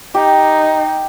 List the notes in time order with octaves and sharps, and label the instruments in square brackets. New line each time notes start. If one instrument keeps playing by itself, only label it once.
[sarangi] D#4 [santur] G4